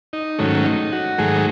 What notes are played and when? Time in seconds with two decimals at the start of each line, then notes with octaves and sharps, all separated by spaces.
0.13 D#4
0.39 G#2 D#3 F#3 A3 C#4
0.65 D#4
0.92 F#4
1.18 G#2 D#3 F#3 A3 G#4